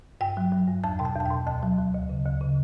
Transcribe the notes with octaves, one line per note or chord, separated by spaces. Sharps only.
G2 G5
F#3
F#3
G2
E2 A5
B2 G5
A5
E2
A5
G5
B2
D2 A5
F#3
F#3
D2
C#3
D2
C#3